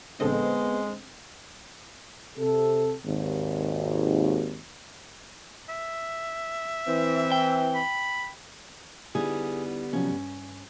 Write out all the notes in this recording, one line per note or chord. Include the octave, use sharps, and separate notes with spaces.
A#1 D3 G#3 B3 C4 A4 D#5
C3 A4
G#1 D#2
E5
E3 C4
G5
B5
D3 G3 B3 D#4 E4 G#4
C3 F3 F#3 C#4
G2